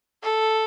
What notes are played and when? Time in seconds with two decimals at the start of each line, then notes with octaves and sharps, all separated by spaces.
0.23 A4